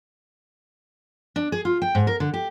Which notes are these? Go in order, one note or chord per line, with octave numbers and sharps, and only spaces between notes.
D4
G#4
F4
G5
G#2
A#4
D3
G4